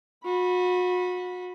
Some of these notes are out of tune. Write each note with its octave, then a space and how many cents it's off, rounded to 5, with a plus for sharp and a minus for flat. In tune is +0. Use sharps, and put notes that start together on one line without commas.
F#4 -35 B5 -10